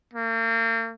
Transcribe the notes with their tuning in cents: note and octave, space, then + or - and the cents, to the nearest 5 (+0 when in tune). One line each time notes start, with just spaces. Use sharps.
A#3 -40